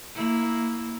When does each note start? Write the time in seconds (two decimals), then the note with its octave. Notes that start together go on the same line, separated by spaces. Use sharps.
0.15 A#3 E4